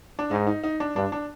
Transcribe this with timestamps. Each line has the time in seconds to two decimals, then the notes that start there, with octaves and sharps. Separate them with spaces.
0.19 D4
0.31 G#2 D#4
0.47 D#4
0.64 D#4
0.80 D4
0.96 G2 D4
1.12 D4